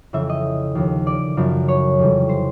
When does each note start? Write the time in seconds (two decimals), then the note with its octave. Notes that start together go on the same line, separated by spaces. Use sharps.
0.13 F2 C#3 E3 E5
0.29 D#5
0.75 D#2 C#3 F3
1.07 D5
1.37 F#2 C#3 F3
1.68 C#5
1.99 F2 C3 E3 G3
2.29 C5